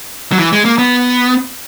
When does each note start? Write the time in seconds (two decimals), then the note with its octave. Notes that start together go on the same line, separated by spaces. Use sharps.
0.32 F#3
0.39 E3
0.53 G#3
0.65 A#3
0.78 B3